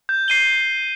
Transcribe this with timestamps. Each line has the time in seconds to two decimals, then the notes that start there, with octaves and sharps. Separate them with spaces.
0.09 G6
0.28 C7 D#7 G7